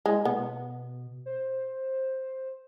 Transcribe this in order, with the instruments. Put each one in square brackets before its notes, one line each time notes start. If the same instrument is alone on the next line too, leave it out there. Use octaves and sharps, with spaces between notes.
[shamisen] G#3 [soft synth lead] E4
[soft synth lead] B2 [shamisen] B3
[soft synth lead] C5